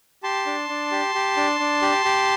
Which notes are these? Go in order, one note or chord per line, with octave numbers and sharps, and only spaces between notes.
G4 A5 C6
D4
D4
G4
G4
D4
D4
G4
G4